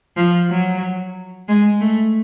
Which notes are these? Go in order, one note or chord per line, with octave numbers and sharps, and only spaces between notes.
F3
F#3
G#3
A3